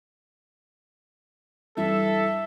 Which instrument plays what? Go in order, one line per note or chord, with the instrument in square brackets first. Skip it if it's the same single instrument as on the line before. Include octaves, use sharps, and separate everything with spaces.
[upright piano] G2 E3 [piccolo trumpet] A4 [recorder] E5